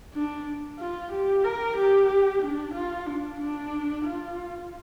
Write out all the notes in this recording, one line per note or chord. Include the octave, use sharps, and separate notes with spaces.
D4
F4
G4
A#4
G4
D4
F4
D4
D4
F4